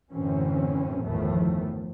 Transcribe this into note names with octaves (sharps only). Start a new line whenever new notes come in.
F#2 A2 D3 E3 C4 C#4
G1 E2 A2 D#3 F3 A3